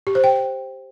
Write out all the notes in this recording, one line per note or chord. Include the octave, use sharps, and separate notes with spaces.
G4
C5
G5